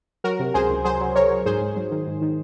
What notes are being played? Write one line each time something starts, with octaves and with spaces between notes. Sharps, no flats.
F#3 F#4 A#4
C3
C#2 G#4 C5
C#2
F#3 G#4 C5
F#3
F#3 A#4 C#5
F#3
G#2 G#4 C5
G#2
F#3
D#3
G#2
D#3